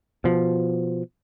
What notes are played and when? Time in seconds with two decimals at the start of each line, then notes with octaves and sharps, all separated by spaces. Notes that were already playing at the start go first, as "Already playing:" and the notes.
0.24 B2 F3